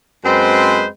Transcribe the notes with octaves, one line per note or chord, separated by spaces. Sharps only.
F#2 G#3 C4 B4 C5